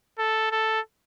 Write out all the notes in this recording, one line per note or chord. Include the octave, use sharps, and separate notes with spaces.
A4
A4